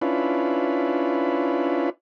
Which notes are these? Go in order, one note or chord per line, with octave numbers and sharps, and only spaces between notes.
C#4 D4 E4 F4 B4